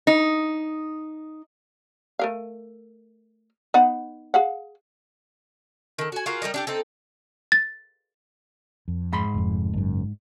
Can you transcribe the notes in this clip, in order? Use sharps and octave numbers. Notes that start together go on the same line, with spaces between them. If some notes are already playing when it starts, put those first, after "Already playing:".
D#4
A3 A#4 F5
B3 D#4 F#5
G#4 F5 F#5
D#3 A4
F#4 G#5
F4 F#4 G#4 A#4
G3 A3 A#4 D#5
D4 G4 A4
C4 D#4 A4
A6
F2
G#2 B5 C6
F1 F2
F#1 F#2